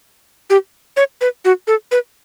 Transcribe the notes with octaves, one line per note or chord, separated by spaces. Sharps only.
G4
C#5
B4
F#4
A4
B4